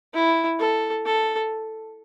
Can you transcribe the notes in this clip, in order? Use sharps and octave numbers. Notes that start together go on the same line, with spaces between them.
E4
A4
A4